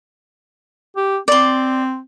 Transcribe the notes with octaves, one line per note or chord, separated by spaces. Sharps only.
G4
C4 D5 C6